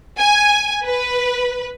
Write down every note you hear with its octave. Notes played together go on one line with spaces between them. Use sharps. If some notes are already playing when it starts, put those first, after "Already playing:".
G#5
B4